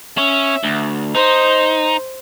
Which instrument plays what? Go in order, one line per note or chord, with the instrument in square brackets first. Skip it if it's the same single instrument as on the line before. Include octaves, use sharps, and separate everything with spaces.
[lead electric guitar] C#4 [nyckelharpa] E5
[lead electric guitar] D2
[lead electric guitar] D#4 [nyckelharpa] C5